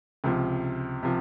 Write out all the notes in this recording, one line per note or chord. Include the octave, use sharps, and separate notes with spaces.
C#2 C3 F3
C3 F3